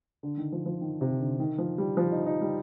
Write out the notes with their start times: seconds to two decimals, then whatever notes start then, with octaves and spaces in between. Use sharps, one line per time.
0.23 D3
0.38 D#3
0.52 F3
0.66 F3
0.81 D#3
1.01 C3
1.20 D3
1.40 D#3
1.58 F3
1.78 G3
1.97 F3
2.12 D#4
2.26 D#4
2.41 G3